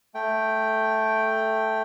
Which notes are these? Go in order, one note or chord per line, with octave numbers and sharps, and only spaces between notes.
A3 G5